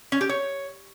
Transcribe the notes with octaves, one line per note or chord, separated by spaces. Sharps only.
C#4
G4
C#5